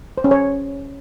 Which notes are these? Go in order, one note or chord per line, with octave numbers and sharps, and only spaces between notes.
C5
C#4
C#5